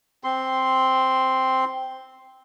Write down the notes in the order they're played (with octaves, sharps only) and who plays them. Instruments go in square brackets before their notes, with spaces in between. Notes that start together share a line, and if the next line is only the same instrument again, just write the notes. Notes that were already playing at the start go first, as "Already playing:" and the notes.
[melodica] C4 C6